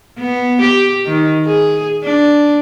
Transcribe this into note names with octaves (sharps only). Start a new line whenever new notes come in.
B3
G4
D#3
G#4
D4